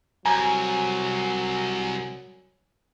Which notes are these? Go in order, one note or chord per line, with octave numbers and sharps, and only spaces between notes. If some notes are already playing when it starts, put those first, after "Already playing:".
C2 F#3 G#5 A#5